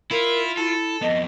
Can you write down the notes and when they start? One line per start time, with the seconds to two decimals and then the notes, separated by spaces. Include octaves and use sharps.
0.11 E4 F4 A#4
0.57 E4 A4
1.02 F2 B3 D#5